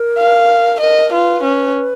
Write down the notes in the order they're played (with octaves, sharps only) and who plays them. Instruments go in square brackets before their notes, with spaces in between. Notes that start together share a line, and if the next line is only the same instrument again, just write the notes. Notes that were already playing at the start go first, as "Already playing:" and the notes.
Already playing: [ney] A#4
[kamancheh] F5
[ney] A#4 [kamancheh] D#5
[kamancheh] F4 [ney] B4
[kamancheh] C#4